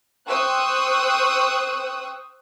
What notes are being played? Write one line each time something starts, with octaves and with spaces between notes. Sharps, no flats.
C5 G5 C#6 D#6 E6 F#6